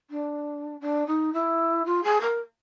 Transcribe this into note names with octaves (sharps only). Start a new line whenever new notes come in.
D4
D4
D#4
E4
F4
G#4
A#4